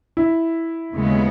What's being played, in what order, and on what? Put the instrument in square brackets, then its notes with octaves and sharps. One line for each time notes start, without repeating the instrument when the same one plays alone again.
[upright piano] E4
[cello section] D#2 C#3 G#3 B3